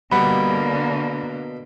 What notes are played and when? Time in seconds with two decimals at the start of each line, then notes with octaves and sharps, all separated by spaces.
0.12 G1 B2 D3 G3 A#3 F#5 B5
0.74 D4